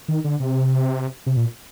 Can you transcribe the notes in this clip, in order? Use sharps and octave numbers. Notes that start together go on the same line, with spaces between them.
D#3
D3
C3
C3
A#2